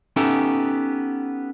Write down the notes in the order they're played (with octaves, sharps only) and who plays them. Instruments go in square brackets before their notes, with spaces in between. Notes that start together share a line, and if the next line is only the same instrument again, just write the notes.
[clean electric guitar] B3 C#4 D#4 G4 A4 E5